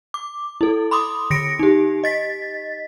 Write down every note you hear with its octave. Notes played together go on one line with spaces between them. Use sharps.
D6
E4 A4
B5 C6 D6 D#6
D3 A#6 C#7 D7
D#4 G4
D#5 A6 B6